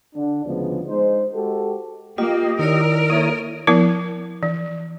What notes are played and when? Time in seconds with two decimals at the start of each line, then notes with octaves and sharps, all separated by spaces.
0.15 D3 D4
0.45 D2 C#3 F3 G#3 B3
0.87 G#3 D#4 C5
1.33 G#3 F#4 G4 A4
2.18 A#3 F4 G4 D#5
2.59 D#3 E4 A#4 C#5 D5
3.10 A#3 E4 A4 C#5 D#6
3.67 F3 B3 E4 A#4
4.43 E3